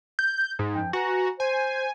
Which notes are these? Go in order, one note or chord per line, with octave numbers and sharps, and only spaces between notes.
G6
G#2
F#2 F3 G5
F#4 B4 G#5 A#5
C5 G#5